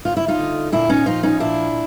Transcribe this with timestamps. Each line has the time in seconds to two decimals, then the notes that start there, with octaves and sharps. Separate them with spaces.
0.05 D2 F4
0.17 E4
0.28 D#4 F4
0.39 D3
0.72 A#2 D4 E4
0.89 C#4 D#4
1.06 F3 D#4 F4
1.23 C#4 D#4
1.40 A#2 D4 E4